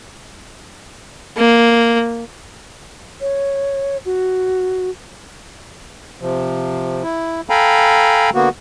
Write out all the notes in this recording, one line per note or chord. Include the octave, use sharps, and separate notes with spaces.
A#3
C#5
F#4
C3 F3
E4
A4 F5 G5 G#5 A#5 B5
D3 A#3 B3 F#4